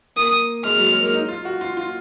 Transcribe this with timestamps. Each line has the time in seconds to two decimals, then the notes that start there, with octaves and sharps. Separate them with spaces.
0.16 A#3 D#6
0.64 G#3 F6
0.77 F#3
0.89 G#3
1.00 A#3
1.13 D#4
1.29 F4
1.45 F#4
1.61 F4
1.77 F4